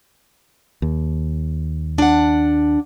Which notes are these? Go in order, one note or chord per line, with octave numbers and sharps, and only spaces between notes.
D#2
D4 F#5